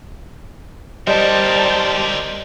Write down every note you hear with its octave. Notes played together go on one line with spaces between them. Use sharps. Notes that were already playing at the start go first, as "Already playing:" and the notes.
G3 G4 A#4 C5 D5 D#5 A5